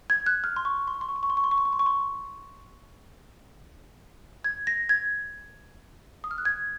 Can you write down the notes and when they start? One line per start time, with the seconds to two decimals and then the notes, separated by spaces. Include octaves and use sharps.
0.10 G#6
0.26 F#6
0.44 F6
0.56 C6
0.65 C#6
0.88 C6
0.94 C#6
1.01 C6
1.09 C#6
1.16 C6
1.23 C#6
1.30 C6
1.37 C#6
1.44 C6
1.51 C#6
1.58 C6
1.65 C#6
1.73 C6
1.79 C#6
1.86 C6
4.44 G#6
4.67 A#6
4.89 G#6
6.24 D#6
6.31 F6
6.38 F#6
6.45 G#6